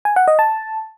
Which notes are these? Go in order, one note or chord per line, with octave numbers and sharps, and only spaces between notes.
G#5
F#5
D#5
A5